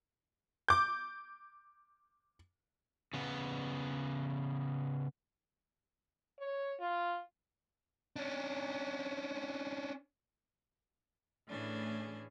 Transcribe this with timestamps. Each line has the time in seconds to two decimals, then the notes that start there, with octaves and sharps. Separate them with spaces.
0.68 D6 G6
3.14 C#3 B3
6.39 C#5
6.80 F4
8.16 C#4 D4
11.48 A2 E3 A3 C#4 D4 G#4